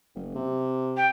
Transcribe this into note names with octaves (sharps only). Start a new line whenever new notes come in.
F#1
C3
G5